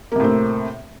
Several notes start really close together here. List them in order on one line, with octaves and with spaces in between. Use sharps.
A#3 C3 A2 C4